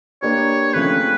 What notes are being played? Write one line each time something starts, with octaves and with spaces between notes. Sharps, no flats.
A#3 D4 G4 B4 C#5
C#3 F3 A3 C4 B4